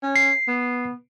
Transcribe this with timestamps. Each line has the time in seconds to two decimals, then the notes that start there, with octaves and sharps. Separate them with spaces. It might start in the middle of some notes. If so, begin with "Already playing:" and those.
0.03 C#4
0.16 C7
0.48 B3